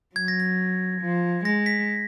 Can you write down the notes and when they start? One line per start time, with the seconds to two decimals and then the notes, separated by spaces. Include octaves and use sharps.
0.16 F#3 G#6
0.28 A#6
0.40 G#6
1.01 F3
1.45 G#3 A#6
1.66 B6